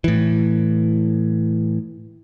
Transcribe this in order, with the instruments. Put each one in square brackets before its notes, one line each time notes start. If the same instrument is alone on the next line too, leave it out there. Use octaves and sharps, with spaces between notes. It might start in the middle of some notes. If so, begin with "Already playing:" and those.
[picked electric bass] A2 E3